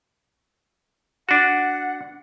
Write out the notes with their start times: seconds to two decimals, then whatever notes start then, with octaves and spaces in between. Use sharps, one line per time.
1.29 D4 F#4 F#5